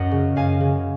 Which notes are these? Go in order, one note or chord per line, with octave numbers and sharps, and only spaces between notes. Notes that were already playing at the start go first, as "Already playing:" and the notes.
Already playing: F#2 D#5 F#5
C#3
F#2 F5 G#5
C#3